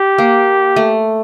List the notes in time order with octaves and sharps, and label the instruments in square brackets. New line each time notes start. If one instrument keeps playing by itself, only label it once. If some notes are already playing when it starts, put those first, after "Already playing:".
Already playing: [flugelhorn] G4
[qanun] A#3
A3